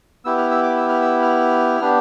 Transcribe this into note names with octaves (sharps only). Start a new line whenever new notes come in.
B3 E4 G4 E6
F6
E6
D6
E6
F6
E6
F6
B3 D4 G4